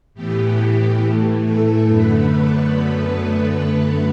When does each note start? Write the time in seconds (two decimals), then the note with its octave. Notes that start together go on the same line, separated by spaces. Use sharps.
0.14 A2 E3 B3 G4
1.01 A2 E3 A3
1.44 A3 A4
1.87 F#2 D3 A3 B3 B4